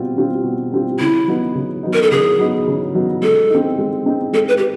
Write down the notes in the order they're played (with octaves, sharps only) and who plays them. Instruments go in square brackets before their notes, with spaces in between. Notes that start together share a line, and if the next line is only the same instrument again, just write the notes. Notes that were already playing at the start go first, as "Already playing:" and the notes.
Already playing: [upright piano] B2 G3 C4 F4
G3 C4 F4
B2
G3 C4 F4
[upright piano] C#3 [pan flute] E4
[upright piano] F#3 B3 D#4
C#3
F#3 B3 D#4
[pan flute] A#4
A4
[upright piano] C#3 [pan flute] G#4
[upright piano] F#3 B3 D#4
C#3
F#3 B3 D#4
[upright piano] G#3 [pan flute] A4
[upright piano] C4 D#4
G#3
C4 D#4
[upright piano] G#3 [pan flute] A4
[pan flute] B4
G4